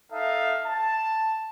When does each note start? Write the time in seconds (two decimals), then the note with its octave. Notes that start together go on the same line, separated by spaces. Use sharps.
0.12 D#4 A4 E5 F5
0.65 A5